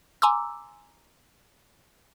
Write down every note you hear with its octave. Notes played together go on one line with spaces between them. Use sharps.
G#5 A#5 C6 D6 E6